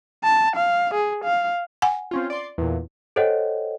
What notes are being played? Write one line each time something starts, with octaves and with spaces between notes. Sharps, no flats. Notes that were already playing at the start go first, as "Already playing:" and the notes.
A5
F5
G#4
F5
F#5 G#5
C4 C#4 F4
D5 C6
E2 A#2
A4 C5 C#5 D#5 F#5 G5